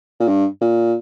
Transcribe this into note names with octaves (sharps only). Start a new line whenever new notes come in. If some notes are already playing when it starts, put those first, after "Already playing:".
A#2
G2
A#2